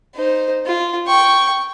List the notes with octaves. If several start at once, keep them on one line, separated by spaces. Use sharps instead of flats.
D#4 C5
F4
G5 C#6